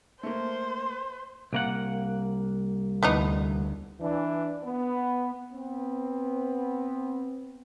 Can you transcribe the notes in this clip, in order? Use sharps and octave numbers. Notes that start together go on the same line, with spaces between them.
A3 A#3 C5
C2 A#3 F#5
D2 E3 B3 D#4
E3 D4
B3
B3 C4